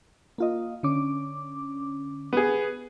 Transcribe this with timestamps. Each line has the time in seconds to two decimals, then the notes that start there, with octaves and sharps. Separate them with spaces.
0.38 A#3 F4 D#5
0.83 D3 C#4 D6
2.33 B3 G#4